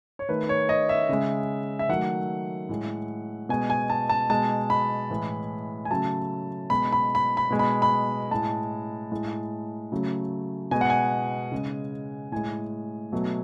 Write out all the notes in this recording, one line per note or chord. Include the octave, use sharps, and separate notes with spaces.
C#5
D#3 A3 B4
C#5
D#5
E5
C#3 G#3
E5
D#3 F#3 A3 F#5
A2 G#3
B2 G#3 G#5
G#5
A5
A5
B2 G#3 A5
B5
A2 E3 G#3
G#5
C#3 F#3 A3 A5
B2 G#3 B5
B5
B5
B5
B2 G#3
B5
B5
A2 G#3 A5
A2 G#3
C#3 F#3 A3
B2 G#3 G#5
F#5
G#5
C#3 G#3
A2 G#3 G#5
B2 F#3 A3